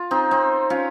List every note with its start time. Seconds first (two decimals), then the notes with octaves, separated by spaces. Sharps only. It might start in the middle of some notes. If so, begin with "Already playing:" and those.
Already playing: F4
0.11 C4 D#4
0.31 C4 D#4
0.70 C#4 F4